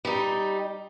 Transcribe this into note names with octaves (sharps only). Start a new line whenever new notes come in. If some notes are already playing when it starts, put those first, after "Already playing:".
G3 D#4